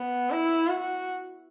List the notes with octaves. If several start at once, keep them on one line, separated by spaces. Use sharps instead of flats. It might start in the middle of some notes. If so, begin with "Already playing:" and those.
Already playing: B3
E4
F#4